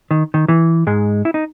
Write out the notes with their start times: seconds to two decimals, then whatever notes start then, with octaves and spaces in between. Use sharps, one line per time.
0.11 D#3
0.34 D#3
0.48 E3
0.87 G#2 G#3
1.25 E4
1.34 D#4